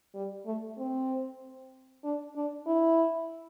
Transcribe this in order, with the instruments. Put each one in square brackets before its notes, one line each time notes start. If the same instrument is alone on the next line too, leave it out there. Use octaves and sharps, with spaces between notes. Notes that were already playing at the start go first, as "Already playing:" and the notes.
[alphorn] G3
A3
C4
D4
D4
E4